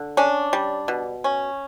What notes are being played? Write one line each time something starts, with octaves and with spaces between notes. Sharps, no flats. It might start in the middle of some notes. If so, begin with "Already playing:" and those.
Already playing: D3
C#4 D4
G3
B2
C#4